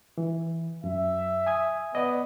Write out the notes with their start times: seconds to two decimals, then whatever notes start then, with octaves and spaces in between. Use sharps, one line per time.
0.18 E3
0.84 F#2 E5
1.46 G#5 D#6 G#6
1.95 B3 D5 D#5